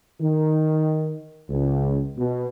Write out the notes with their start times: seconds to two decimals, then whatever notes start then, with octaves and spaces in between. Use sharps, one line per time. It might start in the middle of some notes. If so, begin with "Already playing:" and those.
0.21 D#3
1.49 C#2
2.17 B2